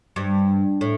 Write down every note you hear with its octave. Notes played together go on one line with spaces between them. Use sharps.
G2
A2